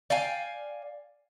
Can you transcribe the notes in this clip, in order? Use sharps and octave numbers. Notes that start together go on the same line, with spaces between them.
D5 F5 G5 G#5